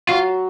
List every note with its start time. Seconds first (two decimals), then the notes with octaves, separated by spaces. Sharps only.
0.09 F#3 F4